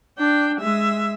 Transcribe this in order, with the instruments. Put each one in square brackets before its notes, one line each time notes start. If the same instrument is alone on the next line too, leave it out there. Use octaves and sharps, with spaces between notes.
[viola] D4 G5
G#3 E5